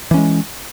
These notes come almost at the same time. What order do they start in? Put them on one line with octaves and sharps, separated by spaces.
E3 C#4 G#3